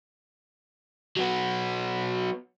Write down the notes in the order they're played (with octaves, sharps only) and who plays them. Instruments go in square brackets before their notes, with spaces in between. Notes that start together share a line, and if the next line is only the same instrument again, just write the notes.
[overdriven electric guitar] F#3 B3